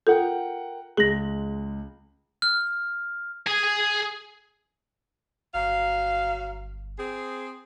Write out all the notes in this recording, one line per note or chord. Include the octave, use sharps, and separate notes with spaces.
F4 A4 A#4 F#5 G5
C#2 G#3 G#4 A#6 F#7
F6
G#4 G#5
G1 F#3 F5
C4 G#4